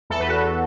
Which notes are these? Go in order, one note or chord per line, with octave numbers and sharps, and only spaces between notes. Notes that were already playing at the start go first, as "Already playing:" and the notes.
E2 A4
B4
F#4 A4